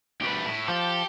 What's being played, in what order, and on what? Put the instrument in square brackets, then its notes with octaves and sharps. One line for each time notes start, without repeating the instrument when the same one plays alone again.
[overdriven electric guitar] D2 B4 [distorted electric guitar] A3 G4
[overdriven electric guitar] A2 [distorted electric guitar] E4
[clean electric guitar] F3 [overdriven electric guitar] G4 [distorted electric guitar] A4